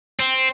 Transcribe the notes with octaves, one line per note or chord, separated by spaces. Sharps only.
C4